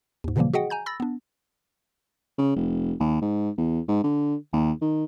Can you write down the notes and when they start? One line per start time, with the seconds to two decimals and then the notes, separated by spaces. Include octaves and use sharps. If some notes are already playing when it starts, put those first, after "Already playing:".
0.24 D#2 G#2
0.36 A#2 C#3 E3 F3 G3 A#3
0.53 F#4 G#4 D#5 F#5 G5
0.70 G#5 A#5 G6
0.86 B5 E6 A6 A#6
1.00 B3 D4
2.38 C#3
2.56 F1
3.00 D#2
3.22 G#2
3.57 E2
3.88 G#2
4.04 D3
4.53 D#2
4.82 D#3